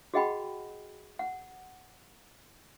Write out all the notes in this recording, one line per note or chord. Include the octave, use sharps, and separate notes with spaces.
F#4 G#4 D#5 F#5 G5 B5
F#5